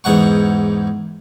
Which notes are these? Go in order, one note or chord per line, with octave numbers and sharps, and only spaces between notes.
E2 G#2 F#5 C#6